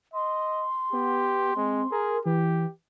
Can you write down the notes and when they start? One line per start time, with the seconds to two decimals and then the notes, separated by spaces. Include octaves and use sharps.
0.14 D#5 C6
0.93 B3 G4
1.56 G#3 C4
1.92 G#4 A#4
2.26 E3 G4